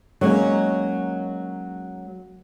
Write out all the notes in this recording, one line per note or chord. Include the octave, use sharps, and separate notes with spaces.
F#3 G#3 A#3 C#4 D#4